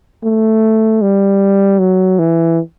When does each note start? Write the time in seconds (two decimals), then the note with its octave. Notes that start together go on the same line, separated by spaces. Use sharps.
0.24 A3
1.02 G3
1.79 F#3
2.19 E3